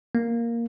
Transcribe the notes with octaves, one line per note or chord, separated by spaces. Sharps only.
A#3